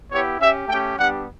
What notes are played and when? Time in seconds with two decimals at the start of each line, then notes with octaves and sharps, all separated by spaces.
0.10 B3 E4 G4 C#5
0.39 C#4 G4 E5
0.68 A3 C#4 G4 G5
0.96 G3 B3 D4 G4 F#5